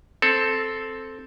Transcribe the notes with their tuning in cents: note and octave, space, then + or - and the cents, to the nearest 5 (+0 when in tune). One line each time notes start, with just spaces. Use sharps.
C4 +0 A4 +0